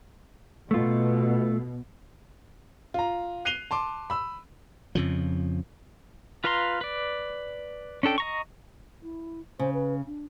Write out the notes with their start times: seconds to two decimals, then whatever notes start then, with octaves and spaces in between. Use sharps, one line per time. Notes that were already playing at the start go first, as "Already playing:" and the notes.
0.71 B2 A3 F4
2.94 F4 A#5
3.45 F#6 C7 D#7 F7 G7
3.71 A5 C6 D6
4.10 B5 E6
4.95 F2 C#3 F3
6.44 F4 B4 F5 A#5 C6
6.81 B4 D5
8.03 C#4 D4 A4 G5
8.18 D#5 A#5 C#6
9.02 E4
9.59 C#3 C5
9.74 B4
10.06 D4